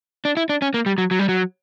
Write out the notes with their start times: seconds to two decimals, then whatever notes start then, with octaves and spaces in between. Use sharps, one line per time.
0.25 D4
0.37 E4
0.49 D4
0.62 C#4
0.74 A#3
0.86 G3
0.98 F#3
1.11 F#3
1.19 G3
1.29 F#3